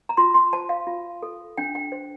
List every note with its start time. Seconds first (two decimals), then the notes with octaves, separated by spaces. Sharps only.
0.09 A#5
0.17 F4 C6
0.34 C6
0.53 C5 A5
0.69 F5
0.87 F4
1.23 A4
1.58 D4 G5
1.75 G5
1.92 C5